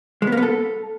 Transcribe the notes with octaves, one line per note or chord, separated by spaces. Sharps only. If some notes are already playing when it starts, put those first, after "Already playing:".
G#3
B3
A#3
B3
A4